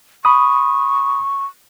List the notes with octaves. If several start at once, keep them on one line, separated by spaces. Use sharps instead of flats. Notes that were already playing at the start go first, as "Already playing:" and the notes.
B5 C#6 D#6